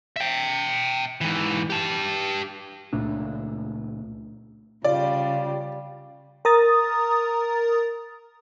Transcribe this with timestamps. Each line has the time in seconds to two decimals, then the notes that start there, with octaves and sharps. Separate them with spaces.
0.16 E5 G5
1.21 G#2 E3
1.70 G4 A5
2.93 C#2 A#2 A3 D4
4.85 C#3 G3 F4 D5
6.45 A#4 A#5 D#6 A6